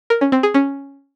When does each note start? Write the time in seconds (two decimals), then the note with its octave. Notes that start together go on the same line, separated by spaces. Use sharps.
0.10 A#4
0.21 C#4
0.32 C4
0.43 G#4
0.54 C#4